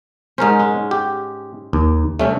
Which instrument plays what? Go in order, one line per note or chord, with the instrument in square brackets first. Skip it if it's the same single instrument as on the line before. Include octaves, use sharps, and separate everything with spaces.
[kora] G#2 C#4 [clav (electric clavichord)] D#4 A#4 C5
[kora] G#3
[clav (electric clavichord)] G4
D#2
[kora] G2 C3 [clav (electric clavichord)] A3 C#4